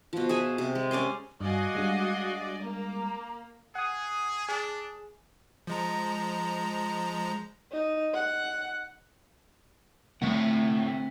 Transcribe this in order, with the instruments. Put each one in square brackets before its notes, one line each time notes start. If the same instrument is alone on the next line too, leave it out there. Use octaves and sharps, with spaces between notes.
[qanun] B2 F3
G#4 E5 G#5
C3
G#3
C#4 D5 G#5 C6
[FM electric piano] G2 [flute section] F#4 F5 D6 [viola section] D5 D#5 G#5
[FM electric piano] G3 G#3 D4
[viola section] A#3 [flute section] A#5 D6
[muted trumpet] G#4 [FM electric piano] F#5 D#6
[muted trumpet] D4 [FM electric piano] G#4
[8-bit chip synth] F3 G#3 A#5
[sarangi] D#4
F#5
[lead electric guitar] A2 [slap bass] D3 A3 A#3 [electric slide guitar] C4 E5 F#5